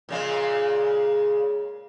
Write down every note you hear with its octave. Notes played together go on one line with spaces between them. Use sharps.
A#2 C#3 G#3